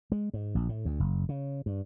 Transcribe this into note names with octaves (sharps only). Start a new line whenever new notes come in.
G#3
G#2
A#1
A2
D2
F#1
C#3
G2